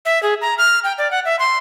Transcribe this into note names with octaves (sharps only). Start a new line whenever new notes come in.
E5
G#4
A#5
F6
G5
D5
F#5
E5
C6